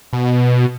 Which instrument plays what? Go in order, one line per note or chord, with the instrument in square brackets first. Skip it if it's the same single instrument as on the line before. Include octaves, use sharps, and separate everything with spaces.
[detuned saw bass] B2